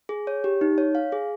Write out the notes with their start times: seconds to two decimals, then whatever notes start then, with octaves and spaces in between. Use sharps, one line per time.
0.09 G#4
0.27 C#5
0.44 G4
0.61 D#4
0.78 C#5
0.95 F5
1.12 G#4